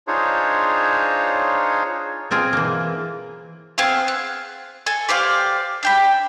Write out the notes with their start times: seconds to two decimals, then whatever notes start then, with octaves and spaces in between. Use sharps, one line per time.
0.07 D4 D#4 F4 G#4 C5 C#5
2.31 B2 C4 F4 G#4
2.53 E3 A#3
3.78 B3 C4 G#4 F5
4.08 F#6
4.86 A4 G#5
5.09 G4 C5 D5 F5
5.83 D4 G5 B5